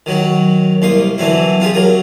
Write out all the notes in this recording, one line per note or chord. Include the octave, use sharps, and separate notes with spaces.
D#3 F#3 F#4
C2 A#3 C6 D#6
D3 E3 F#3 C4 E4
C4 F4 G4 G#4
F#3 A#4 D#6